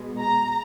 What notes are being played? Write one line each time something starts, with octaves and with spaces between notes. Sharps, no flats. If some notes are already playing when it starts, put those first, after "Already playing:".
Already playing: B2 G#3
A#5